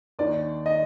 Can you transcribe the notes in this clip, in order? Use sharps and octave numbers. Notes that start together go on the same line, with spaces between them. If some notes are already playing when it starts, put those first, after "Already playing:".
D#2 D#3 D5
D#5